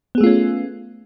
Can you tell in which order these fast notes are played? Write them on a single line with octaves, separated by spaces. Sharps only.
B3 G#4 A3 F4 C#4